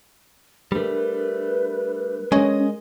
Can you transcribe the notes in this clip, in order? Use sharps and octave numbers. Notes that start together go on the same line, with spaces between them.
G3 A3 D4 A#4 B4
G#3 C#4 G#4 D#5